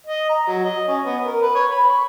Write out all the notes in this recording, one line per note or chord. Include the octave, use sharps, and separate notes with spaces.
D#5
A#5
F#3
D#5
C#4
B3
A#4
B4
C#5
B5
C#6